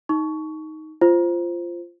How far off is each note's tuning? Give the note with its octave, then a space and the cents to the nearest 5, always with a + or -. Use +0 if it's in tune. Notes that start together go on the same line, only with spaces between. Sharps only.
D#4 +10 C#6 +15
F4 -15 C5 +0